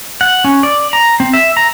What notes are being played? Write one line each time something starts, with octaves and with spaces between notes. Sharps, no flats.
F#5
C#4
D5
A#5
C4
E5
A#5